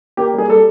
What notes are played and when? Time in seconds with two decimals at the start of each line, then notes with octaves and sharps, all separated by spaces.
0.17 A#3 G4
0.34 G3 G#4
0.49 G3 A4